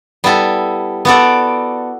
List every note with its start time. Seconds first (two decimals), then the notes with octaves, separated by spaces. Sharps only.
0.24 G3 B3 E4 A4
1.05 B3 F#4 A4 D5